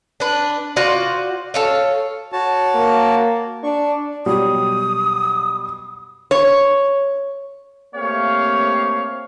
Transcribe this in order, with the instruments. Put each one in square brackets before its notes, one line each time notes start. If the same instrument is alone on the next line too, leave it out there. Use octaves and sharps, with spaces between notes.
[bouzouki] D4 B4
F4 F#4 C5 D5
A4 C#5 F5
[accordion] F#4 C#5 A5
[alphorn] A#3
[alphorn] D4 [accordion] C#6
[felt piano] B2 F#3 G3 [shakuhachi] D#6
[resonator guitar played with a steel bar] C#5
[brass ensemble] A3 A#3 C4 G4 C#5 F5